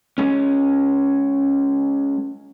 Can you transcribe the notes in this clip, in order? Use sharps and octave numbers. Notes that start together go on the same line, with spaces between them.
G#3 C#4